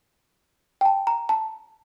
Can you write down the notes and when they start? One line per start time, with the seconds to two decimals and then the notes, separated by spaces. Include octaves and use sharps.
0.81 G5
0.85 A5
1.07 A#5
1.29 A5